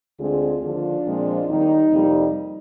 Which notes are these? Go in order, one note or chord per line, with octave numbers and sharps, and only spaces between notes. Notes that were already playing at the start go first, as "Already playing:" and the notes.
D2 D3 G#3 C4 F4 G#4
D#2 D3 F3 D4 F4
A#2 F3 G#3 C4
D#2 D#3 G3 D#4
F2 C3 G3 A#3